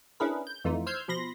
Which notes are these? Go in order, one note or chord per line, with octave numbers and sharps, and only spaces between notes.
C#4 D4 E4 G#4 A#4 B4
G6
F2 E3 A3 D#4 F4
C5 E6 F6 G6 G#6 C7
B2 F3 B5 C6 A#6